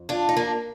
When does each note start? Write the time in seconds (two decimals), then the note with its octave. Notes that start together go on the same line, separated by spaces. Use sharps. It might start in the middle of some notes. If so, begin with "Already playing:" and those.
Already playing: F2
0.09 D4 F4
0.29 D#4
0.37 A#3 D4